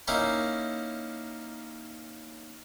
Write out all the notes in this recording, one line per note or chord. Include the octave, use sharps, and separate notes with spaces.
A#3 C#4 D#4 E4